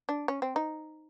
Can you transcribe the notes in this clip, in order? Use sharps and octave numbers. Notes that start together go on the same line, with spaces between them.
D4
C#4
C4
D#4